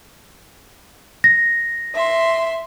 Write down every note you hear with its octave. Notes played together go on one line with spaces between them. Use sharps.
A#6
E5 C6